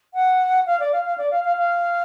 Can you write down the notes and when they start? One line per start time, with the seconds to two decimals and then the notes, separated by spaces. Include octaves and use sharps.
0.14 F#5
0.66 F5
0.80 D5
0.92 F5
1.05 F5
1.18 D5
1.31 F5
1.44 F5
1.57 F5